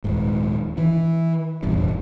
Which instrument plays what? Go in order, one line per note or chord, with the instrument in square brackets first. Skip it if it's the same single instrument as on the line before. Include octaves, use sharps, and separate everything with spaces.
[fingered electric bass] D#1 G#2
E3
F1 A#1 E2 G2